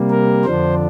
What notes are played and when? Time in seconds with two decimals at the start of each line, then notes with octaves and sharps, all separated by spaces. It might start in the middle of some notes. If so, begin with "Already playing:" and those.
Already playing: C3 G3 A#3
0.11 A#4
0.44 F2 D3 F3 D4 C5